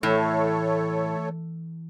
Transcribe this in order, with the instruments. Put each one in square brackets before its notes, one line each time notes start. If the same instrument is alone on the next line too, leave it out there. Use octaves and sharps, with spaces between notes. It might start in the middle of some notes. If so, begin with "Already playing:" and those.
[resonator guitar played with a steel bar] A2 [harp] E3 [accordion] A3 A4 C#5